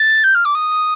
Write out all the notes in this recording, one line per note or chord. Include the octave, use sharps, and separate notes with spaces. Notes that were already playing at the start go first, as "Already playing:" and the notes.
Already playing: A6
G6
F6
D6
D#6